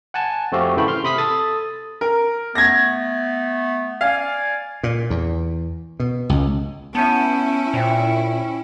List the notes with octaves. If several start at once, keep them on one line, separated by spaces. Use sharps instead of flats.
F#5 G#5 A5
F2 A3 C4 F#4 G4 F5
G#1 C#3 E3 A3 G5 B5
C6 F6
C3 B5 D#6 B6
A4 D#6 A6
A#4
A3 B3 G#6 A#6
D5 F5 G#5
A#2
E2
B2
C#2
B3 C#4 E4 A5 G6 D#7
A#2 C5 E5 G5